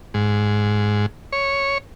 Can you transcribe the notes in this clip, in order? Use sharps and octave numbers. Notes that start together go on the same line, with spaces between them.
G#2
C#5